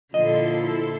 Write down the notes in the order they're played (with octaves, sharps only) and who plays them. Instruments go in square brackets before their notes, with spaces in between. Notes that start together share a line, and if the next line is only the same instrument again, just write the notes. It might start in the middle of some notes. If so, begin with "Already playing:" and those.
[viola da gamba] A#2 D3 [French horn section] F3 F4 [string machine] E4 A4 C6 [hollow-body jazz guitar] D#5